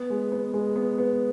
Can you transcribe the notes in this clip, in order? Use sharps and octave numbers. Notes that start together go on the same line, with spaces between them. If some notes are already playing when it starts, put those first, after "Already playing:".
Already playing: B3
G#3
B3
G#3
B3
B3